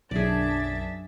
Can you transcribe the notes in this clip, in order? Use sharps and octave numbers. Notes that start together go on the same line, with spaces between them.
B1 F#2 D4 G#4 D5 E5 A6